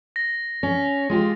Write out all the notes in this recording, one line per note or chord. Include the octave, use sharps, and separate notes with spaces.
A#6
C#4
G#3 F4 G4